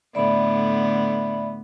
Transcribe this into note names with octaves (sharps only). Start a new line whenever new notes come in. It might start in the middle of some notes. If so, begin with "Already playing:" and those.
A2 D3 B3 D5 E5 B5